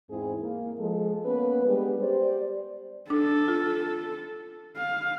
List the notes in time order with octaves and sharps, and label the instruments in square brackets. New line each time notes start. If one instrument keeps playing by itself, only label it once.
[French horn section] E2 G#2 C4 E4 G#4
A#3
F3 G#3 A4
A#3 B3 C#4 B4
G3 G#3 B3 D4 G4
G4 C5 D5
[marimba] D4 [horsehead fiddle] A4
[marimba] F4
[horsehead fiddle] F5